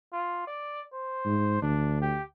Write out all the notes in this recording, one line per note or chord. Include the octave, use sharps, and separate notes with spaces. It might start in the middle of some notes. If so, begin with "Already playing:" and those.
F4
D5
C5
G#2
D2 D4
G4